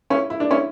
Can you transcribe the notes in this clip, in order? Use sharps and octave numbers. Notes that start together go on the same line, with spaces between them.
C#4 E4
E4
D4
C#4 E4